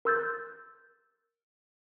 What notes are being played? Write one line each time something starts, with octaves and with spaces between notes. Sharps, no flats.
A#4 C6 E6 F#6 G6 A6